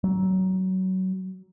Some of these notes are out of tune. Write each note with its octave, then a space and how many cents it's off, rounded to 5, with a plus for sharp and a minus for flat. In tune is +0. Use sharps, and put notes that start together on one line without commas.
F#3 +20